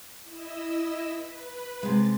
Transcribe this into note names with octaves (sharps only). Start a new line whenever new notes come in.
E4 D#5 E6
B4
C3 G#3 A6